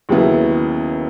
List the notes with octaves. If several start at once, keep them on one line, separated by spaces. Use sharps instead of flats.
D#2 C#3 F#3 B3 E4